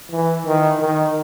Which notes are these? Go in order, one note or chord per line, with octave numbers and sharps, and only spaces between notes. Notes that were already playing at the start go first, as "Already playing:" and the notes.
E3
D#3
D#3